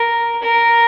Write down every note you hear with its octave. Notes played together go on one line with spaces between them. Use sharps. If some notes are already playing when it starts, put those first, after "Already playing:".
Already playing: A#4
A#4